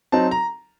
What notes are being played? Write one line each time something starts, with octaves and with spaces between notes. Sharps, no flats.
F#3 C4 D#4 A5
A#5